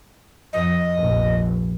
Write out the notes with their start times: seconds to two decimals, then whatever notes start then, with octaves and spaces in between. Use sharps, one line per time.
0.53 F2 D#5
0.96 F1 A#1